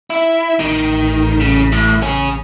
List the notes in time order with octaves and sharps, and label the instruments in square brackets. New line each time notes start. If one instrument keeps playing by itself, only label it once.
[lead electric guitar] E4
[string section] A1 [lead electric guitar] D#3
[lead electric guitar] C#3
A2
C#4 G#4